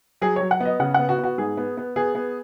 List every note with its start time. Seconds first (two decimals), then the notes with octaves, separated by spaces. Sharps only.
0.21 F#3 G#4
0.36 F#3 C#5
0.51 F#5
0.60 B3 D#5
0.80 C#3 F#5
0.94 B3 F#5
1.09 F#4
1.18 B3
1.24 F#4
1.38 G#2 G#4
1.57 B3
1.77 B3
1.96 B3 G#4
2.15 B3